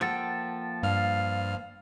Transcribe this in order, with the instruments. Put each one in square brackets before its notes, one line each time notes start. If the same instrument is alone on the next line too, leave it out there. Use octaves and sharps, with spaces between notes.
[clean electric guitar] F3 A4 [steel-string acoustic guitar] A#3 F#5 G5
[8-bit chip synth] G2 F6 [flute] F5